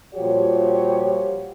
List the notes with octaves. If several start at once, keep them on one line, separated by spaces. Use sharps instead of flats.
A#2 F3 G3 F#4 G4 C#5